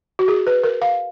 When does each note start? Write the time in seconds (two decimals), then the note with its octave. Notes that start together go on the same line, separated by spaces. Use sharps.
0.19 F#4
0.28 G#4
0.47 B4
0.64 A#4
0.82 F5